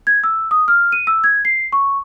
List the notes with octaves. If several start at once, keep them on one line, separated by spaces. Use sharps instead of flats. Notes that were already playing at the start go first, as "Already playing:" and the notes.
G#6
E6
D#6
F6
D#7
E6
G#6
C7
C#6